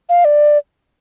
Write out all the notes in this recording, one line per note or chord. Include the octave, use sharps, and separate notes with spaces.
F5
D5